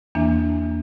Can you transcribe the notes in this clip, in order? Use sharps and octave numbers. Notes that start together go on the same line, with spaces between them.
E2 E3 A#3 D4